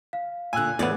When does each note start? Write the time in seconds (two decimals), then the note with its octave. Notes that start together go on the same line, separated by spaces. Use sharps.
0.13 F5
0.53 A#2 D3 G#5 E6 F#6
0.79 E2 A2 B3 D5